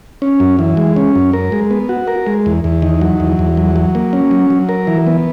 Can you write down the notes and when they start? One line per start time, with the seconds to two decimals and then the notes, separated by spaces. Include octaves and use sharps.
0.22 C#4
0.40 F#2
0.59 E3
0.77 G#3
0.96 C#4
1.15 F#2
1.33 A#4
1.52 G#3
1.71 B3
1.89 F#4
2.07 A#4
2.27 G#3
2.46 E2
2.64 E2
2.82 D#3
3.01 F#3
3.20 E2
3.39 E2
3.57 F#3
3.76 F#3
3.95 A#3
4.13 C#4
4.31 F#3
4.50 F#3
4.69 A#4
4.87 E3
5.07 B3